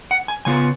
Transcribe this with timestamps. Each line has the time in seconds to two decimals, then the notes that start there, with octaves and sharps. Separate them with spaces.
0.11 F#5
0.28 G#5
0.45 C#3 G#3 B3 F4 G#5